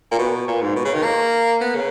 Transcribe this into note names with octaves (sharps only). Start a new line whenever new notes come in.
A#2
B2
A#2
G#2
B2
C#3
D#3
A#3
B3
C#3